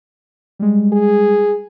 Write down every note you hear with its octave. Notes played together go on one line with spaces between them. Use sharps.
G3 G#3
G#4